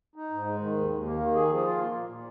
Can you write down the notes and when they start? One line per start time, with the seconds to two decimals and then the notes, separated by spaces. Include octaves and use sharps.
0.16 D#4
0.30 G#2
0.45 G#3
0.60 D#3
0.75 D#2
0.90 D#2
1.05 A#3
1.20 D#3
1.34 G#4
1.49 F3
1.64 F4
1.79 A#3
1.94 A#2
2.09 A#2